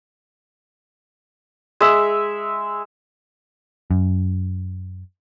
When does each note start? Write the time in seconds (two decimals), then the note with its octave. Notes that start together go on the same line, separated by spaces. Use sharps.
1.81 G#3 E5
3.91 F#2